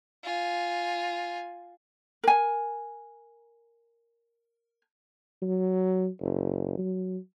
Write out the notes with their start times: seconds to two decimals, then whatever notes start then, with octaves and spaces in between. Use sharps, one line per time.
0.23 F4 G#5
2.24 A#4 G#5
5.42 F#3
6.21 F#1
6.78 F#3